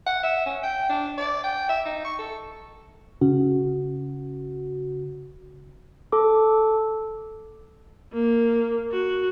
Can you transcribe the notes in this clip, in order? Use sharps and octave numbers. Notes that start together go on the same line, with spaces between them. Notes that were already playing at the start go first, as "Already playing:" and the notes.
F#5
E5
C#4
G5
D4
D5
G5
E5
D#4
C#6
A4
C#3 F#4
A4 D6
A#3
F#4